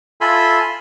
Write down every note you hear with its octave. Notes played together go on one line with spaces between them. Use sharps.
F4 A4 E5 G#5 B5 C6